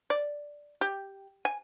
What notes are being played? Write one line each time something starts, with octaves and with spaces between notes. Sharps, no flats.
D5
G4
G#5